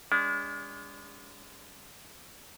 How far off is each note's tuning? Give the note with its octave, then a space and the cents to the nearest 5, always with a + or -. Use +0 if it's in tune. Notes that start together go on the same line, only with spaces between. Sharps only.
G#3 -30 D4 -40